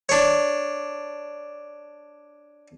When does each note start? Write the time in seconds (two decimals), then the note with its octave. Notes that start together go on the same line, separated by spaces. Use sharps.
0.09 D4 C#5